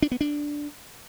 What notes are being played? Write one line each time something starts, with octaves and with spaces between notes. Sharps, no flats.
D4
B3
D4